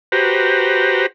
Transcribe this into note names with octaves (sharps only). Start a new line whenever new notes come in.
F#4 G4 B4 C5 A#5